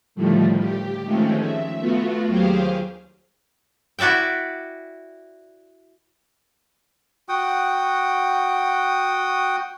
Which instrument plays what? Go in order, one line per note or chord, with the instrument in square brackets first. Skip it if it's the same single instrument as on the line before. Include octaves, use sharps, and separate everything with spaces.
[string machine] A2 D3 D#3 F3 G3 A3
G4
D#3 F3 G#3 A3 C4 C#4
E5
A3 B3 F4 F#4
D#2 F#3 G4 G#4 C5 F5
[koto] E4 F#4 D5 E5 G5
[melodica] F#4 F#5 G5 D#6